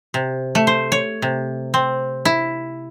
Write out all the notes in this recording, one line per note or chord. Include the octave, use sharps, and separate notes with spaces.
C3
A3
C5
C#5
C3
C4
E4